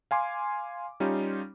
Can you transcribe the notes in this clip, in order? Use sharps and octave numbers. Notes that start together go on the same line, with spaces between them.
F5 G#5 C6 D6
G3 C#4 D#4 F4 G4